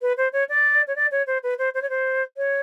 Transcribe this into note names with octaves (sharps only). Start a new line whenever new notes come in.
B4
C5
C#5
D5
C#5
D5
C#5
C5
B4
C5
C5
C#5
C5
C#5